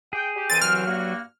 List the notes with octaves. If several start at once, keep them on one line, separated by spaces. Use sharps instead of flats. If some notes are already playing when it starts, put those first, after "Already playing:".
G#4 G5
G4
C2 E3 C4 A6 D#7
F#3 F6
G2 A#3 F#4